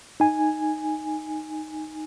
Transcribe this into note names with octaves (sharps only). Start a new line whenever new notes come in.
D#4 G#5